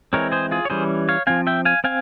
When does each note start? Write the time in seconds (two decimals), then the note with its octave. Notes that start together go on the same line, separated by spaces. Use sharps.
0.13 E3 G#3 C4 A#4 C#5
0.32 G#4 C5
0.51 F4 G#4
0.65 C#5
0.70 E3 G3 C#4 G#4 C5
1.09 C#5 F5
1.27 F3 C4 F5 G#5
1.47 E5 G5
1.65 F5 G#5
1.84 C4 F5 G#5